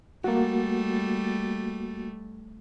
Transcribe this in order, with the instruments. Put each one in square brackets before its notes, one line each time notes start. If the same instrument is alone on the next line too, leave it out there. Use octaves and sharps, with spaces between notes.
[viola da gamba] G3 A3 [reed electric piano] A#3 F#4